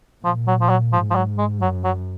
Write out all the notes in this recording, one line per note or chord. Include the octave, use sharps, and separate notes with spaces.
A#2 F3
F#3
F3
F#3
G#2 F3
F3
F#3
G#3
F#2 F#3
F#3